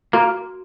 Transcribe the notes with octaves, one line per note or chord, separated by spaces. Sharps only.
A#3 F#4